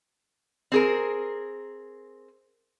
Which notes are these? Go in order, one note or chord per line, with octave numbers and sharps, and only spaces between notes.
C4 G#4 A#4